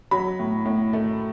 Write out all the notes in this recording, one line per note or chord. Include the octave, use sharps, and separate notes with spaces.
F#3 B5
A2
A2
A3